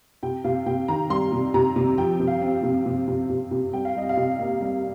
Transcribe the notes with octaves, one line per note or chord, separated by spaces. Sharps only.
C3 G5
C3 F5
C3 G5
D#3 A#5
G3 C6
C3
C3 A#5
C3
F3 G5
C3
F5
C4
C3
C3
C3
C3
C3
G3 G5
F5
G3 D#5
F5
C3
A#3
G3